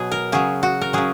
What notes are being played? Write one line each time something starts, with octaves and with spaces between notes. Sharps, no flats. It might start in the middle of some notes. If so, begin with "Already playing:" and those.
Already playing: B2 F#3 G#4
A#4
C#3 F#3 G#4
F#4
A#4
C#3 F#3 G#4